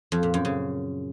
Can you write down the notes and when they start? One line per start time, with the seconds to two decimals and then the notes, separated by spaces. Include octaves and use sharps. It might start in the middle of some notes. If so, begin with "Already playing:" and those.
0.12 F2
0.23 A#2
0.34 F#2
0.45 C#3